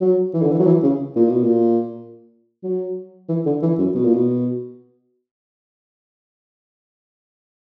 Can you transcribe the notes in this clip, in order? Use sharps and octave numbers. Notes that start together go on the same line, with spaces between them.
F#3
E3
D3
E3
F#3
E3
C#3
A#2
B2
A#2
F#3
E3
D3
E3
F#2
B2
A#2
B2